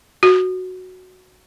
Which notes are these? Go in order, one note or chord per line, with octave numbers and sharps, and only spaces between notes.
F#4